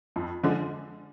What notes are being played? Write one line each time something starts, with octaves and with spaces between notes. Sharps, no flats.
F2
D3 F3 G#3